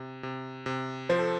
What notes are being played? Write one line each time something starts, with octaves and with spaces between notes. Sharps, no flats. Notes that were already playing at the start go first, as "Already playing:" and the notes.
Already playing: C3
C3
C3
F3 C5
A4